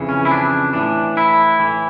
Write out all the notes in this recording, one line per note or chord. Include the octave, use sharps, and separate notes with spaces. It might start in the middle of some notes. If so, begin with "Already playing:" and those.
Already playing: F2 C#3 E3
C#4
E4
D4
A2 E3 D4
E4
A2 E3